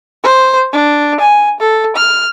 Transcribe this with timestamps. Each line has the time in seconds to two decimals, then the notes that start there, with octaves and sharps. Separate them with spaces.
0.23 C5
0.73 D4
1.20 G#5
1.60 A4
1.96 F6